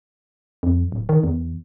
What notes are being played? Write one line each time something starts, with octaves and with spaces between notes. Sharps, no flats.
F2
D1
D#3
E2